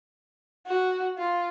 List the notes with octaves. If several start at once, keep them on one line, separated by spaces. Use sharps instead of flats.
F#4
F4